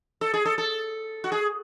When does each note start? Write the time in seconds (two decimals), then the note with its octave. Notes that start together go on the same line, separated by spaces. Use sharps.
0.21 A4
0.34 G#4
0.45 A4
0.58 A4
1.24 F#4
1.32 G#4